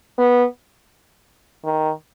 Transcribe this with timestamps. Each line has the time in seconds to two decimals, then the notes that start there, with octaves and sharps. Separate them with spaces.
0.18 B3
1.64 D#3